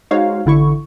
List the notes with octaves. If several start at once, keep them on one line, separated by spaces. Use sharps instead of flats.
G#3 D#4 F#4 C5 C#5 F5
A1 D3 E4 C#6